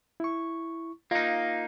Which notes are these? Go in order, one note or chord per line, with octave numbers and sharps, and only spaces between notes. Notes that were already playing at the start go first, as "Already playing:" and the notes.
E4 C#6
A#3 D#4 F4 D#5 F5